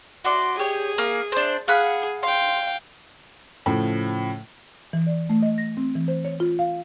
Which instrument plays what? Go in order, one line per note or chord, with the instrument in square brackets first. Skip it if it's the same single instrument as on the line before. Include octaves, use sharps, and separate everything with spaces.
[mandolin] F#4 D5 [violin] C6
[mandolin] G4 C#5 [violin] G#4
[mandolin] A#3
D4 C5
[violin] G#4 [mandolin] F5 F#5 B5
[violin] F5 G5 [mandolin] C6
[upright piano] A2 C#3 F3
[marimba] E3
D5
A3
D#5
A#6
C4
E3
C5
C#5
F4
F5